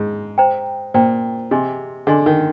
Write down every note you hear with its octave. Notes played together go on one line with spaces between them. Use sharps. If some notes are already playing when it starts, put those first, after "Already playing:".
Already playing: G#2
C5 G5 A#5
A#2 C5 G5 A#5
C3 G#4 D#5 G#5 C6
D3 G#4 D#5 G#5 C6
D#3